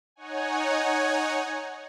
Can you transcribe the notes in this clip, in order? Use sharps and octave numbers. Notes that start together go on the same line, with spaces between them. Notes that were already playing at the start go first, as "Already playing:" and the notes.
D#4 C#5 F#5 G#5